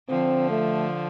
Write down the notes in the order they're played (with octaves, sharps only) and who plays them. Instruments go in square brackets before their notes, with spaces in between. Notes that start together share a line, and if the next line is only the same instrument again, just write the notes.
[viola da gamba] D3 F3 [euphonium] C4
[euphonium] A3